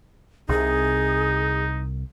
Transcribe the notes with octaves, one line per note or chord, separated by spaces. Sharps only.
C2 C3 D#4 G#4